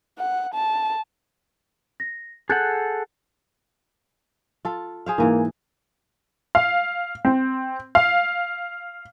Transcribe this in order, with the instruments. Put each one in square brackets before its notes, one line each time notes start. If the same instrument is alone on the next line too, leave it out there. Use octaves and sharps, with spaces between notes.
[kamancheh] F#5
A5
[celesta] A#6
[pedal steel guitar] G#4 A4 F#5 [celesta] F#6 G6 A6
[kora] F4 A4
G#4 C5 F5
[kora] G#2 E3 [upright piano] A#3
[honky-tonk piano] F5
C4
F5